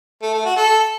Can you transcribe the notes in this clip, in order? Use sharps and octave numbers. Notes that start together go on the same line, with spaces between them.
A3
A3
F#4
A4